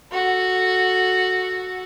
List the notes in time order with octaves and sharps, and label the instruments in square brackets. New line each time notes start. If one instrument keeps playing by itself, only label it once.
[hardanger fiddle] F#4 A4